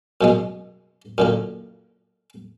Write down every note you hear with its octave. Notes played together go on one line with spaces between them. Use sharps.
F#2 B2 G#3
F#2 A#2 D3